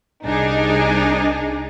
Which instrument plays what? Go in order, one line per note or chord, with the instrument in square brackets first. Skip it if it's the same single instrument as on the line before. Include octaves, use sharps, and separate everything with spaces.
[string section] C2 D4 D#4 G#4